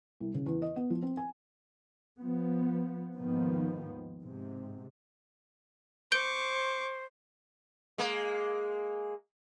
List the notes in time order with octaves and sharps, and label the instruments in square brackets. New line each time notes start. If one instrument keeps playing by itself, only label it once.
[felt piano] C2
C#3
E2
D#5
B3
F3
C4
G#5
[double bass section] F3 B3
D#2 G#2 D#3 F3 B3
G#2 C3
[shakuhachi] C5 [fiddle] C#6 D6 [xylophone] G6 D7 G7
[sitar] G#3 A#3